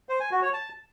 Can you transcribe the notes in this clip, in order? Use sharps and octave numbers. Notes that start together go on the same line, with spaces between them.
C5
G#5
F#4
C#5
A5